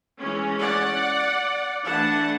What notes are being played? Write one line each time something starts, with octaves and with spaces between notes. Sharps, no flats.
E3 G#3 C#4
D5 F#5
E3 A3 D4 F#5 A5